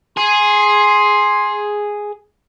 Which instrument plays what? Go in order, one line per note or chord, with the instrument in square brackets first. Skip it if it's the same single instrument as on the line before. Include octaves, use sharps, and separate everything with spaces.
[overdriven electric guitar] G#4 [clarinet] C6